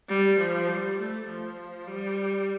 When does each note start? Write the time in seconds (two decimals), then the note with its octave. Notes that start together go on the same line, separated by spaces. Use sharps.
0.09 G3
0.38 F3
0.68 G3
0.99 A3
1.29 F3
1.87 G3